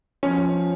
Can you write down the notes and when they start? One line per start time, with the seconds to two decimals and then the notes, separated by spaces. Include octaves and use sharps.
0.23 F3 C#4